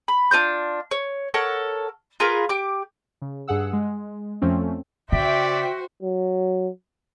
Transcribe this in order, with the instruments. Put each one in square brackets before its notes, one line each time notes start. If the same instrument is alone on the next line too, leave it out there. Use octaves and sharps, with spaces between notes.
[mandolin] B5
D4 F4 C5 G6
C#5
A4 A#4 C#5 F#5
F4 G#4 A#4 B4
G4 D6
[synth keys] C#3
G2 G#4 F#5 E6
G#3
F2 F3 A3 C4 C#4
[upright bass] C#3 [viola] F#4 C5 [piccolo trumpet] D5 [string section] E5 G5 B6
[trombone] F#3